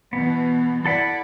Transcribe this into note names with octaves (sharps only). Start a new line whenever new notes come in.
B2 E3 B3
E4 A4 D5 F#5 B5